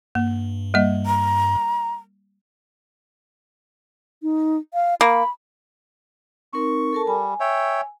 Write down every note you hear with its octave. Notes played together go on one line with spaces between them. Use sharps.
G2 A#3
G3 A#3 D#5
A#5
D#4
F5
A#3 B5
C4 D#4 A#4 C#6
A4 A#4 A5
G3 G#5
C#5 E5 G5